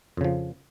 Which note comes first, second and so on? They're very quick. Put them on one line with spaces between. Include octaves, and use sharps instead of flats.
F2 C#3 F3